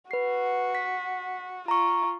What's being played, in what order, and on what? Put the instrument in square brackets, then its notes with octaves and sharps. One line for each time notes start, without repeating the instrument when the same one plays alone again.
[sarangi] F#4 [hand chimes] B4 C7
[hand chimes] B6
[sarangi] F4 [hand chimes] A#5 C#6